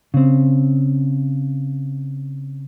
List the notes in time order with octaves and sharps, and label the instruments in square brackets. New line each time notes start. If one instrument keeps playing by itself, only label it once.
[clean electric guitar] C#3 C4